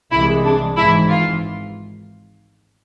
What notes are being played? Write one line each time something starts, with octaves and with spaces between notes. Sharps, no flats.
C2 C3 E3 G#3 E4
D4
G#1 G#2 E3 E4
F4